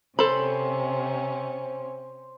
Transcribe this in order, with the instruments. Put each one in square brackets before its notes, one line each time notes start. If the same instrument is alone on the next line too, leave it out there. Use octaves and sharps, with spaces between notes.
[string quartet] C3 C#4 [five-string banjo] A4 B5 [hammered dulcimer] C5